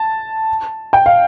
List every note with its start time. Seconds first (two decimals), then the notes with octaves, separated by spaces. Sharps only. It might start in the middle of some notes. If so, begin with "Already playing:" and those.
Already playing: A5
0.93 G5
1.06 F5